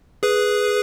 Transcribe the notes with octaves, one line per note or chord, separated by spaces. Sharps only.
G#4 B4